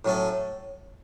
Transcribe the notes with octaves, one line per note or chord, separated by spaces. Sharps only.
A2 F#3 C#4 A4